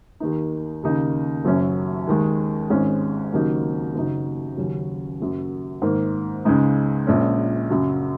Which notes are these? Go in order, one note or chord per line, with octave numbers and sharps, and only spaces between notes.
D#2 D#3 A#3 D#4
D#2 C#3 A#3 D#4
F#1 F#2 F#3 C#4
D#2 D#3 G#3
G#1 G#2 G#3 C#4
D#2 C#3 F#3 A#3 D#4
F#1 F#2 C#3 F#3 D#4
D#2 C#3 F#3 C#4
F#1 F#2 F#3
G#2 D#3 A#3
C#2 C#3 G#3 D#4
A#1 A#2 G#3 C#4
F#2 C#3 F#3